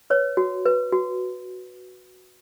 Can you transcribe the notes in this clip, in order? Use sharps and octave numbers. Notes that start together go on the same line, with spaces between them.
B4 C#5
F#4
B4
F#4